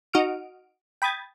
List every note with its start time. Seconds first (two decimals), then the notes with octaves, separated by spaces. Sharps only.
0.13 D#4 F#4 D#6 F6 D7
1.02 G5 B5 D#6 G#6 A6